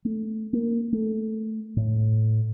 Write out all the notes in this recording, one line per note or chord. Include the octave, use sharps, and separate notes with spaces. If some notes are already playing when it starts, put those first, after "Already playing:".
A3
A#3
A3
A2